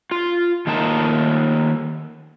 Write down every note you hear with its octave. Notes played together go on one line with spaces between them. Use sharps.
F4
D#3 A3 A#3 D#4 F4 A5